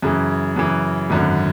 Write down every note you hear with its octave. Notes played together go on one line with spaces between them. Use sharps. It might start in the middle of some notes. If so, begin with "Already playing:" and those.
F#2 C#3 E3
F#2 C#3 E3
G#1 F#2 D3